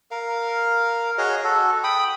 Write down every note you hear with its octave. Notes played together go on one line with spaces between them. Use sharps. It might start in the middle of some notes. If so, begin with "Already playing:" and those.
A#4 F5
F#4 G#4 C#5 D#5
F#4 A4
G5 B5 D#6